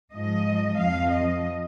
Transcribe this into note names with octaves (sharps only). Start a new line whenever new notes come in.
G#2 F3 D#5
F2 F3 F5
D#5